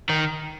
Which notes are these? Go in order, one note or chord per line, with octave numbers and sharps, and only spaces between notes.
D#3